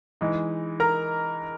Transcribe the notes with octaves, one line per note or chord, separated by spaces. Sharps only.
E3 G#3 D#4
A#4 A#5